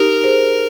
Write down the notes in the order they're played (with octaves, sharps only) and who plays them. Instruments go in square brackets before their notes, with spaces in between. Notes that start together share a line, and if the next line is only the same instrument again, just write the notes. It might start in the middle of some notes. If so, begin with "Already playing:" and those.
Already playing: [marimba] D#4 G4 [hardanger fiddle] A#4
[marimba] G#4 C5